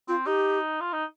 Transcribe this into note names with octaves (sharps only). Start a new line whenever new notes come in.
C4 F4
D#4 G4
F4
D#4